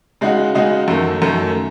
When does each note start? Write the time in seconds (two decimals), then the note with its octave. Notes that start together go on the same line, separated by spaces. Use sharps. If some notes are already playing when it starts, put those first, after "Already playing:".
0.21 C#3 G#3 D#4 F#4
0.55 C#3 G#3 D#4 F#4
0.88 F#2 D#3 A3
1.22 F#2 D#3 A3